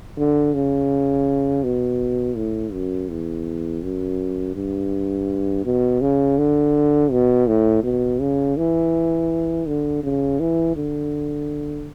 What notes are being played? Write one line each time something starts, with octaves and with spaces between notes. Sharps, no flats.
D3
C#3
B2
A2
F#2
E2
F#2
G2
B2
C#3
D3
B2
A2
B2
C#3
E3
D3
C#3
E3
D3